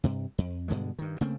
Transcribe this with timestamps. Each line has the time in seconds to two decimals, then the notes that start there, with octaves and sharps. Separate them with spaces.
0.04 G2 C3
0.38 F2
0.68 G2 B2 D3 G#3
0.99 G2 D#3
1.21 C#3 A3 A#3 C4